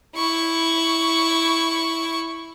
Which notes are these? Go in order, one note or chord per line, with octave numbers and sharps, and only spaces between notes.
E4 C#6